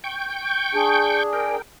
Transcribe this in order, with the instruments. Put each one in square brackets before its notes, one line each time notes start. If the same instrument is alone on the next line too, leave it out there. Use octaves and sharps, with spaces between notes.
[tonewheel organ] G5 C#6 G6
[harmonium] D4 G#4
[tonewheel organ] A#4 G5